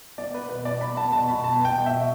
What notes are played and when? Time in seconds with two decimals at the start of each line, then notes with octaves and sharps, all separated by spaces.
0.18 B3 D5
0.34 B3 B4
0.49 B2 B4
0.65 B2 D5
0.81 B3 B5
0.97 B3 A5
1.12 B2 A5
1.28 B2 B5
1.44 B3 A5
1.59 B3
1.65 G5
1.76 B2
1.86 B2 E5